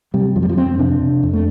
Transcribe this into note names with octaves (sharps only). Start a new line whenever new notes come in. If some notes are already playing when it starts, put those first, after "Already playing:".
C3 G3
F2 F3
G3
F3
F2 C4
C3 D4
C3
F2
A3